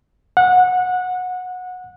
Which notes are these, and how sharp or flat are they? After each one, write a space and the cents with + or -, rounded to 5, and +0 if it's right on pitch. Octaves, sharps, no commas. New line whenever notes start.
F#5 -20